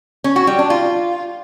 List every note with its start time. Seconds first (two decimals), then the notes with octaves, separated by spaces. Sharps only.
0.24 C#4
0.36 F#4
0.47 G3
0.59 D4
0.70 F4